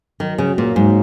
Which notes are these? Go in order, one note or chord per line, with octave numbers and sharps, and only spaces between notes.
D#3 F#3
C#3 F#3
A#2 A#3
G#2 F#3